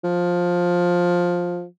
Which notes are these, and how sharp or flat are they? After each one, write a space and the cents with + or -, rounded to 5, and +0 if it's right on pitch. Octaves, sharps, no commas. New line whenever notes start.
F3 +10